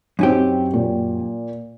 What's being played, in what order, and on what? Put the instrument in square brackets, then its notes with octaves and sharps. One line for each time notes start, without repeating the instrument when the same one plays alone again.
[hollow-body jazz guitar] F#2 C#4 G4 [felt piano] C4 D#4
[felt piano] A#2